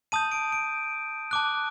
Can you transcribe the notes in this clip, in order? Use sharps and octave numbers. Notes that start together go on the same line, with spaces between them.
A5 D#6 G6 D#7
D7
D7
A5 D6 F#6